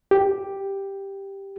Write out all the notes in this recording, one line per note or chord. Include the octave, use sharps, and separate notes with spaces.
G4